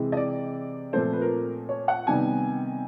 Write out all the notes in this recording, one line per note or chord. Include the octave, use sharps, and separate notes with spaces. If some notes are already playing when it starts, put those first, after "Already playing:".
Already playing: C3 E3 G#3
D#5
D5
A#2 F3 A3 C4 C5
B4
A#4
C#5
F#5
C3 D#3 G3 B3 G#5